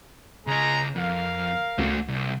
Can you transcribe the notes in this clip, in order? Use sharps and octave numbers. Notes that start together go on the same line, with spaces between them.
C#3 G#3 G#4 D#5 A#5
F2 A#4 F5
C#2 A3 F#4
C2